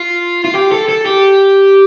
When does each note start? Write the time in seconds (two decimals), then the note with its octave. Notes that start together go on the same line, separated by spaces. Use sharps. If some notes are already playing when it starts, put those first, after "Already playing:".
Already playing: F4
0.45 F4
0.55 G4
0.72 A4
0.89 A4
1.06 G4